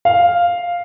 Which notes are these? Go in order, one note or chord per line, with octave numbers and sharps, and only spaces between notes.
F5